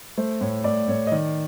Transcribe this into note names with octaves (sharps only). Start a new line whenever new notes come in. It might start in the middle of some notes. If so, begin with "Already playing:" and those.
A3 C5
A2 C#5
A2 D5
A2 C#5
D#5
D#3 D5